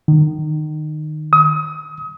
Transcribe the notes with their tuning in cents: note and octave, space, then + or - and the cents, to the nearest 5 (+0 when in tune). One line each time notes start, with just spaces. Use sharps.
D#3 -25
D#6 +30